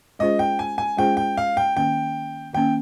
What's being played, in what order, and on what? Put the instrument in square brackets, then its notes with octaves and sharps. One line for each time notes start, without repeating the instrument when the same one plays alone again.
[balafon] G#3 C#4 F4 G#4 C5 [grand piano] D#5
[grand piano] G5
G#5
G#5
[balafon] G#3 C#4 F4 G#4 C5 [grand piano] G5
[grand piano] G5
F5
G5
[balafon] D#3 A#3 C#4 [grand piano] G5
[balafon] D#3 A#3 C#4 [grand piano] G5